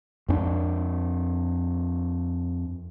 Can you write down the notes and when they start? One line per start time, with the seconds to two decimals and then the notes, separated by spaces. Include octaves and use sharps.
0.29 F2 C#4 D4